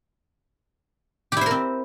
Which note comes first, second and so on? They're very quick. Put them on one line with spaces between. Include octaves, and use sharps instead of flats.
G4 E4 C5 A#4 C4